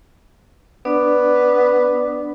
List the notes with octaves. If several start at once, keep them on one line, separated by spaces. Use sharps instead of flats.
B3 D4 D5 D6